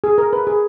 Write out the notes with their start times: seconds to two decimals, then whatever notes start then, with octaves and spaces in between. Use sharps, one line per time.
0.04 G#4
0.18 A#4
0.33 B4
0.47 G#4